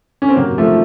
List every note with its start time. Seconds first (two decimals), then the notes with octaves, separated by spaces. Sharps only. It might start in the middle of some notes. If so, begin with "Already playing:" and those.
0.22 C#4
0.29 C4
0.36 C3 F#3 A#3
0.50 C3
0.58 F3 A3
0.65 D#3